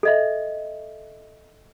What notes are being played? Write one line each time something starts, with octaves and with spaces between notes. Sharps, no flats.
A4 D#5 E5